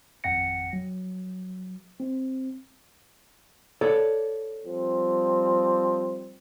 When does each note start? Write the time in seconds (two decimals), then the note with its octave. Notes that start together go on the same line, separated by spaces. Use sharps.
0.24 G#1 F2 F#5 G5 A#6 C#7
0.73 F#3
2.00 C4
3.81 A4 C#5 D5
4.64 F3 G3 C4